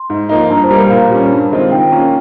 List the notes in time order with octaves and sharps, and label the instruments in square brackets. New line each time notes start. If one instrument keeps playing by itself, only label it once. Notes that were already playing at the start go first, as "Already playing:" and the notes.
Already playing: [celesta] C6
[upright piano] G#2
F3 A#3 D#4
[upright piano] G2 [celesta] A#5
[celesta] C5
[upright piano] G3 A#3
[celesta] A#4
[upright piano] A#2 [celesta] F5
[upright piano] G3 C#4
G2
D#3 G#3 C4 F4
[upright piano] D#3 [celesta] G5
[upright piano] A#3 C#4 F4